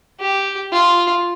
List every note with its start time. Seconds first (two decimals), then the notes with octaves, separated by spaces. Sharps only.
0.20 G4
0.73 F4